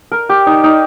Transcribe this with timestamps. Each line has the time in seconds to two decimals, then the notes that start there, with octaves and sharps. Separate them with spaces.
0.12 A#4
0.29 G4
0.47 D#4
0.64 D#4